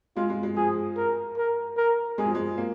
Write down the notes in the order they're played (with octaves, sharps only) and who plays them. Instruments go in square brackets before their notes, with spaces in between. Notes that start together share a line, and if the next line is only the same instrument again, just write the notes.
[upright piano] G#3 [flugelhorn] F4
[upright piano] G#3
G#3
[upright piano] F3 [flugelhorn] G#4
[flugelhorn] A#4
A#4
A#4
[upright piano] G#3 [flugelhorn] G#4
[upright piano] F3
G#3
A#3